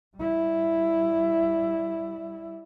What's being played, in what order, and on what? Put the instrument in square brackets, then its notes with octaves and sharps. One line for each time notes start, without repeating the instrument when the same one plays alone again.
[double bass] G3 E4